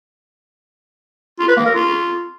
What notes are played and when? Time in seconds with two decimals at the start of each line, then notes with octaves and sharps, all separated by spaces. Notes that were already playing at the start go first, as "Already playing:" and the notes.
1.39 F4
1.48 B4
1.57 A#3
1.66 A#4
1.74 F4